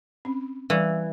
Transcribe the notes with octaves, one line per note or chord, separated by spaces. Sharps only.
C4 C#4
E3 G3 D5